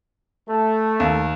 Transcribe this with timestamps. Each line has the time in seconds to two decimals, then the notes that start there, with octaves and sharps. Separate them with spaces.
0.49 A3
1.00 D#2